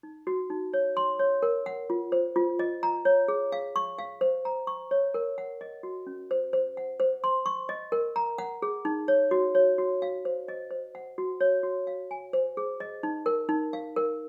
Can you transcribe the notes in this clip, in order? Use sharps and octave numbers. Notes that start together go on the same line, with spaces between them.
D#4
F#4
D#4
C#5
C6
C#5
A#4
F#5
F4
C5
F4
D#5
A#5
C#5
G#4
F5
C#6
F5
C5
A#5
C#6
C#5
A#4
F#5
D#5
F#4
C#4
C5
C5
F#5
C5
C6
C#6
D#5
A#4
A#5
F#5
G#4
D#4
C#5
F#4
C#5
F#4
F5
C5
D#5
C5
F#5
F#4
C#5
F#4
F5
G#5
C5
G#4
D#5
D#4
A#4
D#4
F5
A#4